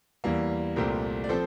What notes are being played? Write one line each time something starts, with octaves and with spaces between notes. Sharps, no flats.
E2 E3 G3 A#3
C2 A#2 A3 C4 G4 A#4
D5
F3 C4 A4 C5